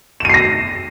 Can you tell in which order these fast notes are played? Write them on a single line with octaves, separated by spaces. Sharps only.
E7 D#7 C7 A#6